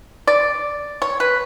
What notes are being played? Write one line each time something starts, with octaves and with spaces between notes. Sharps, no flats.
D5
C#5
B4